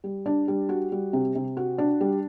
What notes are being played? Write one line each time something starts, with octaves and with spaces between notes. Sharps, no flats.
G3
D4
G3
F#4
G3
C3
C3
F#4
D4
G3